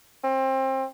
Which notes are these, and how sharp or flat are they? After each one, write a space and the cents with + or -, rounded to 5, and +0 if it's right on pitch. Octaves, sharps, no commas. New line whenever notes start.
C4 +25